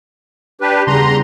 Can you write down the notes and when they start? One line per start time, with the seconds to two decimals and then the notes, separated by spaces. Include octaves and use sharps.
0.61 D4 G4 B4
0.87 E2 C#3 G3 G#4 A#5 C6